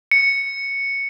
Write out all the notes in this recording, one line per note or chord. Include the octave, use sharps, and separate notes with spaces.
C#7